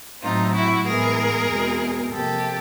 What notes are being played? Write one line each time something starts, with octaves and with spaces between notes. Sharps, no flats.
A2 F#3 A3 C4 D#4 F4
E4 F#4
A2 E3 G#3 B3 G#4 A#4
E2 B2 G#3 C4
C3 F3 A#3 G4 A4